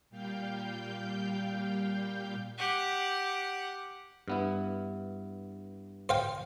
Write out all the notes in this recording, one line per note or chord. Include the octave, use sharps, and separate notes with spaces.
A#2 G3 F5 G5 G6
G4 F#5
G2 B3 E4
C5 F5 G5